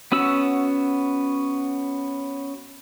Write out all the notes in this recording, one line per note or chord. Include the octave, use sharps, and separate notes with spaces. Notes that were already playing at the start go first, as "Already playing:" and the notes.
B3 C#4 F#4 E6